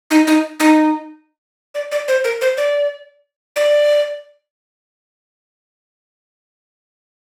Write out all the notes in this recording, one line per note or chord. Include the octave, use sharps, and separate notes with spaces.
D#4
D#4
D#4
D5
D5
C5
A#4
C5
D5
D5